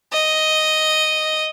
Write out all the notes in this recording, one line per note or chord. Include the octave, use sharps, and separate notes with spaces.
D#5